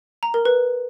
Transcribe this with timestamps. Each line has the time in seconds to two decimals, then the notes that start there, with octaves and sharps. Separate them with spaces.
0.23 A#5
0.34 A#4
0.45 B4